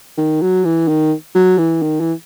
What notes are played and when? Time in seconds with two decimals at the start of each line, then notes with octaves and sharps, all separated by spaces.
0.17 D#3
0.42 F#3
0.65 E3
0.88 D#3
1.35 F#3
1.58 E3
1.82 D#3
2.00 E3